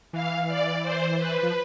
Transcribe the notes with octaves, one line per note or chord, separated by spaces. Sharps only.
E3 F5
D5
C5
B4
F3